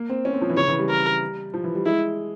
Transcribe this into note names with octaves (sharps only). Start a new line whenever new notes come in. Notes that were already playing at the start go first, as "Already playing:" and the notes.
Already playing: A#3
C4
C#4
C4
F3
E3
C#3 C#5
E3
G3
A#4
F3
E3
G3
G#3 E4